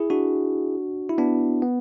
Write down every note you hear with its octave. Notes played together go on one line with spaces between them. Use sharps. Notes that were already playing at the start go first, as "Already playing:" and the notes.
Already playing: E4 G#4
D4 F#4
E4
B3 D4
B3